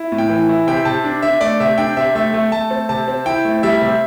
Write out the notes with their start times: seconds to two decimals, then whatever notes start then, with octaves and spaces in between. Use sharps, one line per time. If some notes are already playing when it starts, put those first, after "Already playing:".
Already playing: E4
0.12 A2
0.18 G5
0.30 E3
0.49 E4
0.67 C3 G5
0.85 C3 A5
1.04 D4
1.22 D4 E5
1.41 A3 D5
1.60 C3 E5
1.78 D4 G5
1.97 C3 E5
2.15 A3 E5
2.34 A3
2.52 A3 A5
2.70 C4
2.89 C3 A5
3.08 C4
3.26 E4 G5
3.45 A3
3.63 G3 E5
3.82 C3